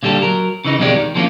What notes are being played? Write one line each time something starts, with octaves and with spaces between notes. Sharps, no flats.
A#2 D3 G3 G4 A4
F#3 A#4
C#3 E3 D#4
F2 B2 D#3 G#3 G4 D5
D#3
F3 G3 A#3 B3 C#4 F4